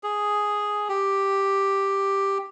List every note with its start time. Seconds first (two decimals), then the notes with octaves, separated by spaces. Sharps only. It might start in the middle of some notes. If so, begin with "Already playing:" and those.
0.03 G#4
0.89 G4